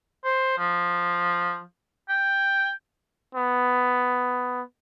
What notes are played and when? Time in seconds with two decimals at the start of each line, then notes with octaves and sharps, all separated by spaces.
0.24 C5
0.58 F3
2.09 G5
3.35 B3